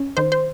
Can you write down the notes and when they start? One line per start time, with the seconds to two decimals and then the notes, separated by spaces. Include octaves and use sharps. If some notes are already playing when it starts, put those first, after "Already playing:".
Already playing: C#4
0.17 D#3 C5
0.32 C5